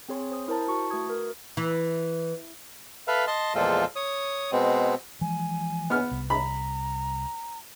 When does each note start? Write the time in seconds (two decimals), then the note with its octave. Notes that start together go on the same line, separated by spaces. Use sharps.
0.09 C4 G#4 C#5 C6
0.31 C5 D#6
0.48 E4 A#4 C5 A5 A#5
0.67 E4 F#4 A5 C#6
0.90 A3 F#4 B4 D#6 G#6
1.10 A#4
1.57 E3
3.08 A4 B4 E5 F5
3.27 D#5 A5 C6
3.55 E2 A#2 F3 G#3 F4 A4
3.96 C#5 D#6
4.52 B2 G#3 B3 C4
5.21 E3 F3 G#3 G#5
5.90 B3 F6
6.11 C2
6.30 A#5 B5